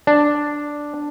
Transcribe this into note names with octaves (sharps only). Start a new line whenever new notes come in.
D4